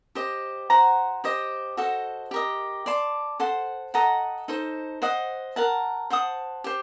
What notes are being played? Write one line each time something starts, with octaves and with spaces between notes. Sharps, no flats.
G4 C5 D#5
F#4 C5 F#5 A#5
G4 C5 D#5
F#4 A4 C5 D#5
G4 A#4 D#5
D5 A5 C6
A4 C5 F#5 C6
A4 D#5 F#5 A#5
D#4 A4 C5
C5 D#5 F#5
A#4 F#5 A5
C5 F#5 A5 D#6
G4 C5